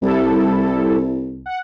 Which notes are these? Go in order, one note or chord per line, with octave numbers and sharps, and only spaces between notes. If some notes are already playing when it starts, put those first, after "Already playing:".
C2 G3 E4 A4
F#5